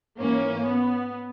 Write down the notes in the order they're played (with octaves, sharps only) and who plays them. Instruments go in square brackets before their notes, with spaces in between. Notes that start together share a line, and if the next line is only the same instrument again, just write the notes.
[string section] G#2 E3 A#3 C#4
B3